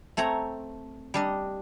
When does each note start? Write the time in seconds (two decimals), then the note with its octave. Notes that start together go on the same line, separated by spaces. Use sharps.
0.17 A3 C4 C#5 A#5
1.14 G3 D4 D#5